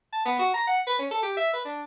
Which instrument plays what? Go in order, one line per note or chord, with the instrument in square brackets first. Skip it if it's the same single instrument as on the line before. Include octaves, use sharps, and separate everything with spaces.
[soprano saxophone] A5
B3
F#4
A#5
F#5
B4
C#4
A4
G4
E5
B4
D4